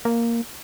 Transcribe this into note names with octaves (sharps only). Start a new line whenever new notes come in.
A#3